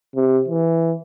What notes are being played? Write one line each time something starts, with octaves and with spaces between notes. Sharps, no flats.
C3
E3